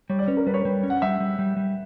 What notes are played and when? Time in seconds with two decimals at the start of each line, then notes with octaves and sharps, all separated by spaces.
0.10 G3 C#5
0.19 D5
0.28 C#4 B4
0.37 A#4
0.46 G3 B4
0.54 C#5
0.62 G3 B4
0.83 C#4
0.90 F#5
1.02 G3 E5
1.20 G3
1.39 G3
1.57 G3